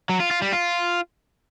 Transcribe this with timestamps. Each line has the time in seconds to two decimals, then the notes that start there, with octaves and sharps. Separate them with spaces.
0.09 F#3
0.20 F4
0.31 F4
0.42 G3
0.53 F4